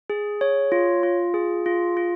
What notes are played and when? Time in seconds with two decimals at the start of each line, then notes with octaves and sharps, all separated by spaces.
0.10 G#4
0.41 C#5
0.72 F4
1.03 F4
1.34 G#4
1.66 F4
1.97 F4